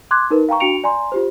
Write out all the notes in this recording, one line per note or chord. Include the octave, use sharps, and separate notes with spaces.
C6 D6 F#6 G#6
D#4 A#4 B4
F5 G5 A#5 C#6
D4 F#4 G5 C#7 D7 F7
D5 G#5 A#5 C6
F4 G4 C5